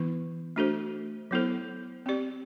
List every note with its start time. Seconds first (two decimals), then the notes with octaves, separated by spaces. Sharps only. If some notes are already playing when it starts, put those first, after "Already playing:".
Already playing: E3 B3 E4
0.56 A3 D4 F#4 A4 C5
1.31 F#3 B3 E4 A4 C5
2.06 C4 G4 D5